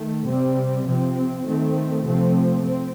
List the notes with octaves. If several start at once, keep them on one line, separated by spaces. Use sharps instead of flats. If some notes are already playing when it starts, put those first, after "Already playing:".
Already playing: D#3 A3
C3 G3 C4
C3 F3 C4
D#3 A3 C4
C3 F3 A3 C4
C4